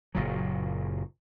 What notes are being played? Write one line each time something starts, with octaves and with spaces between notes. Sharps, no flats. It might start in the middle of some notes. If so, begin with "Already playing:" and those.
F#1 A#2 F#3